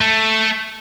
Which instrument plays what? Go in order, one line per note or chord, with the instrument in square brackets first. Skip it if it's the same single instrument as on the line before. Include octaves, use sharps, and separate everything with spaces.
[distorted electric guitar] A3